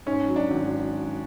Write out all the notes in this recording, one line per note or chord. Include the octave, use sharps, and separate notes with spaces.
G#2 C#4
F#3
D4
G#1